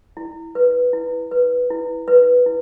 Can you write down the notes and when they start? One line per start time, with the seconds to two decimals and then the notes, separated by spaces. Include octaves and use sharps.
0.17 E4
0.55 B4
0.93 E4
1.31 B4
1.70 E4
2.08 B4
2.46 E4